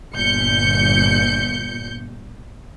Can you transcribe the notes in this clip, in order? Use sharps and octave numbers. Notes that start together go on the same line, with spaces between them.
G1 A#2 G6 C#7